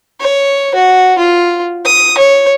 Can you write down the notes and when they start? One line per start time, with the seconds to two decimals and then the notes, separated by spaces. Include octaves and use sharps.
0.20 C#5
0.74 F#4
1.18 F4
1.85 D#6
2.18 C#5